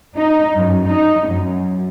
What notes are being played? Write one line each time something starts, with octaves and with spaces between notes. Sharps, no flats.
D#4
F#2
D#4
F#2